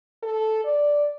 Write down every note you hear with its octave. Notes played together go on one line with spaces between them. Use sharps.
A4
D5